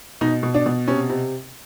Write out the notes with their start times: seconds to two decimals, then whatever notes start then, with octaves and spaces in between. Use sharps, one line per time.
0.21 B2 D#4
0.43 B2
0.54 D4
0.66 B2
0.88 C3 C#4
1.09 C3